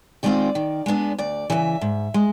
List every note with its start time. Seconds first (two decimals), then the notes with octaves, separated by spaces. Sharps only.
0.23 D#3 G#3 C4 F4 D5
0.55 D#3
0.86 G#3 B3 D4
1.18 D2 D5
1.50 C#3 E3 E5
1.81 G#2
2.14 G#3